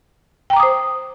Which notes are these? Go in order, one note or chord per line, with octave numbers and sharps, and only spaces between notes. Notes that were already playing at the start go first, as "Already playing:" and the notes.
C5 G5 A#5 D6 D#6